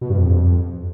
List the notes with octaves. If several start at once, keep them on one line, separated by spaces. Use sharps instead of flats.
B2
G2
F2